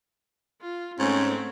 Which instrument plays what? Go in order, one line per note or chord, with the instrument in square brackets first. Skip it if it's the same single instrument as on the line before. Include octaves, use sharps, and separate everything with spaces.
[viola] F4
[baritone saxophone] G#2 [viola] A3 C4 [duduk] C#4